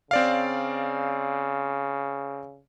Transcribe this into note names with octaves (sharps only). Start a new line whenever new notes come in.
C#3 C4 D5 F5